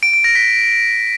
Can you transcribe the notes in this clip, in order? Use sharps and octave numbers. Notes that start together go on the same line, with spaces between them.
D7
D7
A#6
B6